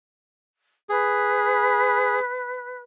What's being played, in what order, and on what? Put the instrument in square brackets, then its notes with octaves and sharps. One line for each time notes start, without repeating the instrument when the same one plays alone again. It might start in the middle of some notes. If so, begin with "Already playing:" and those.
[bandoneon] G#4 [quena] B4